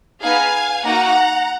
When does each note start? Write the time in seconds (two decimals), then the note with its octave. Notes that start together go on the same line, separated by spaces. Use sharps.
0.20 B3 D#4 G#4 F5 G#5
0.83 A#3 D#4 F#4 F#5 A#5